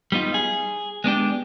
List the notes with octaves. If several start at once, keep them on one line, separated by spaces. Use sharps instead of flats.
G3 B3 D#4 F4
G#4
G#3 B3 D4 G4